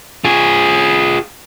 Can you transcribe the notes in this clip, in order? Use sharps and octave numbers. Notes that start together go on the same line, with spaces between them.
F4 G#4